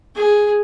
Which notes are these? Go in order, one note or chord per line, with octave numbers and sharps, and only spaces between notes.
G#4